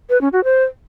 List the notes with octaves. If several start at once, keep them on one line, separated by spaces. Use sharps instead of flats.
B4
C#4
F#4
C5